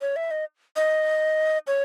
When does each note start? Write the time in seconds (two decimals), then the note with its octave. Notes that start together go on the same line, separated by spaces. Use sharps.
0.01 C#5
0.16 E5
0.31 D#5
0.76 D#5
1.67 C#5